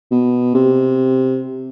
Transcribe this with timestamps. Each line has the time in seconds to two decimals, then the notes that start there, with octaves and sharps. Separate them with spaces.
0.11 B2
0.54 C3